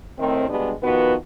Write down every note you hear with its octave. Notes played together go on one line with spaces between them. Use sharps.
A2 D#3 C4
G2 B2 G3 G#3 B3 D4
D#3 F3 B3 F#4 B4